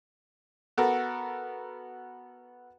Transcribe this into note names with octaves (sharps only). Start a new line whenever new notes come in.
B3 F#4 A4 A#4